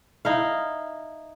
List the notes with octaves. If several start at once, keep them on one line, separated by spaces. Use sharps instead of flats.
D#4 E4 F5